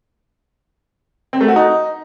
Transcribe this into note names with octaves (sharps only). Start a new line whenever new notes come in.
C4
A3
F#4
D#4